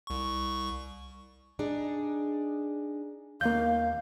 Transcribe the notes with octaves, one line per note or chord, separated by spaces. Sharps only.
C2 C#6
D4 D#4 G#4
D#2 A#3 F5 G6